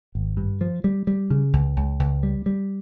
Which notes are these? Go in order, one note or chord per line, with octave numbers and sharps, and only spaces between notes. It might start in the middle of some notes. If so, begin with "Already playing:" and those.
G#1
G2
F3
G3
G3
C#3
C#2
C#2
C#2
G3
G3